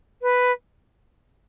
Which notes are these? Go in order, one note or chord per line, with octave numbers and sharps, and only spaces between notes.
B4